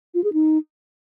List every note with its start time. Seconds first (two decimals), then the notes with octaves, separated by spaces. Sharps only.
0.14 F4
0.24 G#4
0.33 D#4